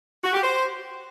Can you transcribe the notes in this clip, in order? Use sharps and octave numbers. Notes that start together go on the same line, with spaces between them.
F#4
G4
C5